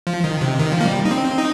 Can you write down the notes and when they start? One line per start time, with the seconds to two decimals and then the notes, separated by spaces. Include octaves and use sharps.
0.07 F3
0.24 D#3
0.41 C3
0.59 D#3
0.72 F3
0.81 A#3
0.86 G3
1.05 D#4
1.11 C4
1.38 D#4